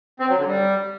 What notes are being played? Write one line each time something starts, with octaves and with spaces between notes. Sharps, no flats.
C4
F#3
D3
G3